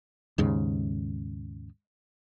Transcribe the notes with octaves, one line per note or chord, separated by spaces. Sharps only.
D#2 G#2 C#3